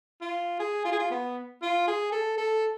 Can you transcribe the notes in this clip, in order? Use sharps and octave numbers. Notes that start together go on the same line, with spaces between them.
F4
G#4
F4
G#4
F4
B3
F4
G#4
A4
A4